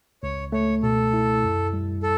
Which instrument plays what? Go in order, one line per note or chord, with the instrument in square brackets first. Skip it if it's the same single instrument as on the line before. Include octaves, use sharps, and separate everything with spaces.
[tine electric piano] C#2 [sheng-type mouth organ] C#5
[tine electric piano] A3 [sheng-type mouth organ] C#5
[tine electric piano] B2 [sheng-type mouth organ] A4
[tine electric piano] E4
F#2
G3
[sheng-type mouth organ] A4